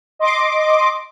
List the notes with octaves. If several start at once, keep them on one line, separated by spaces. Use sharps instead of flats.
D#5 C6 D6